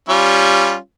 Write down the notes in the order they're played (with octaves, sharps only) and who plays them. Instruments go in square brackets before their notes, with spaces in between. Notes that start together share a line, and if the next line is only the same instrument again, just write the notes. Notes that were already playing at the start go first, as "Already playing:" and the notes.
[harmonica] G3 C#4 F4